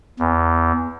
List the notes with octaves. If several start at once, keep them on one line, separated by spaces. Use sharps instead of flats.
E2